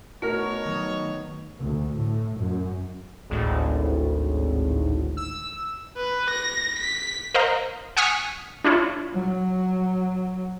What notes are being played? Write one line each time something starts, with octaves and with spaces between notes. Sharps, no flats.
A3 B3 D#4 F#4 A#4 C#5 C#6
D#3 F#3
D2
A2
F#2
G#1 D2 A2
E6
B4
A#6
B6
A#4 C5 D#5 F5 A#5
F#5 G#5 C#6 D#6 F6 B6
D4 E4 F4 C#5
F#3